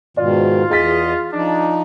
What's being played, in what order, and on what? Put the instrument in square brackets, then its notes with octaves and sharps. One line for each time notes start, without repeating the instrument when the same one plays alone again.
[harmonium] G#2 B2 D#3 [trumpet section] F4 [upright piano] D5
[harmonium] E2 D#5 [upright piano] G#4 A6 B6
[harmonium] F3 D#4 [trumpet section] D4